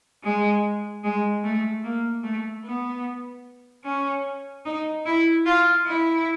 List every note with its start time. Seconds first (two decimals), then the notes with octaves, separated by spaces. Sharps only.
0.24 G#3
1.04 G#3
1.44 A3
1.84 A#3
2.23 A3
2.64 B3
3.84 C#4
4.65 D#4
5.06 E4
5.46 F4
5.86 E4